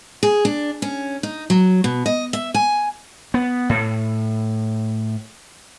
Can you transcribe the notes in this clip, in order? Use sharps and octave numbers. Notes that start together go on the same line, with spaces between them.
G#4
D4
C#4
D#4
F#3
B2
D#5
E5
G#5
B3
A2